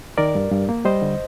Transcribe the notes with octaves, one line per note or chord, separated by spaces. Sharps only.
D#3 A#4 D5
G2
G2
A#3
G3 C5 D#5
D3